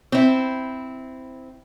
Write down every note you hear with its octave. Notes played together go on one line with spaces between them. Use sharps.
C4 E4